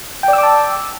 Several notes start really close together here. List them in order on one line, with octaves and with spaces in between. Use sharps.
G5 D5 E6 D6 A5